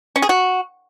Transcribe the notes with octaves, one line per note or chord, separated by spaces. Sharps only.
C#4
G#4
F#4